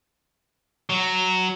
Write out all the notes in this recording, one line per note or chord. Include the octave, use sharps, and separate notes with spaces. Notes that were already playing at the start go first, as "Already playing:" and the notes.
F#3